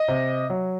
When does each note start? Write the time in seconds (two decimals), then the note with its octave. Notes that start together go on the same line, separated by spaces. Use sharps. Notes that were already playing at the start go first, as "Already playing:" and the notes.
Already playing: D#5
0.08 C3
0.50 F#3